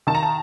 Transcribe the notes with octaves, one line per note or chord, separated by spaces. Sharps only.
D#3 A5
A#5
A5